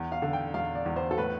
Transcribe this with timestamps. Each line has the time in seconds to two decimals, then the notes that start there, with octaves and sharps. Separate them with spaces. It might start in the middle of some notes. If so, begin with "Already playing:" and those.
Already playing: E2
0.12 F5
0.22 D3
0.33 G5
0.54 E2 F5
0.75 D5
0.86 E2
0.96 C5
1.11 A4
1.17 A2 B4